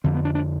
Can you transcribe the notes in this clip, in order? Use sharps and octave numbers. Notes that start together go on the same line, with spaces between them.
F2 D3 C4
B3
D4
D4